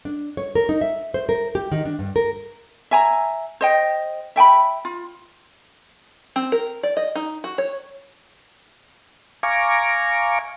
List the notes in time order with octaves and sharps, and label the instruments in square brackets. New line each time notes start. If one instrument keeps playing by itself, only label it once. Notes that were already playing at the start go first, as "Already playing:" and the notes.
[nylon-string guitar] D4
C#5
A#4
D#4
E5
C5
A#4
G4
D#3
D4
G2
A#4
[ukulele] E5 G#5 A#5
C5 D#5 G5
E5 G5 G#5 B5
F4
[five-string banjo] C4
A#4
D5
D#5
D#4
F#4
C#5
[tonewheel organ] F5 G#5 A#5 C#6 D6